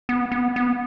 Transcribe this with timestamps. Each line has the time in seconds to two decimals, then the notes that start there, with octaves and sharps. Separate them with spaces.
0.09 B3
0.32 B3
0.56 B3